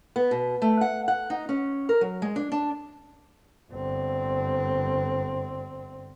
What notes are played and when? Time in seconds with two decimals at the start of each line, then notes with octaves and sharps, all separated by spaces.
0.16 B3
0.31 B2
0.62 A3
0.81 F#5
1.08 F#5
1.30 D#4
1.49 C#4
1.89 A#4
2.01 F#3
2.22 G#3
2.36 D4
2.52 D4
3.72 G1 C4